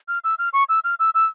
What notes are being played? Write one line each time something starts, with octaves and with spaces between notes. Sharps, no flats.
F6
E6
F6
C#6
E6
F6
E6
E6